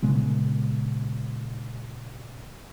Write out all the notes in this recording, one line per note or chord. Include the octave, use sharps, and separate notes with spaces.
A#2 C#3 G#3 B3